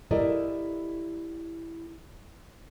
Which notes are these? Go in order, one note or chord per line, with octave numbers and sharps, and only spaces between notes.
E4 G4 A4 A#4 D5 D#5